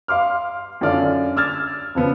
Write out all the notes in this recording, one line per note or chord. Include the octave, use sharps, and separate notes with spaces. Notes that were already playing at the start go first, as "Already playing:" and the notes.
F5 C6 D6 F6
F#2 D3 F4 D5 F6
D6 E6 F6 G#6 A6
C#3 F3 B3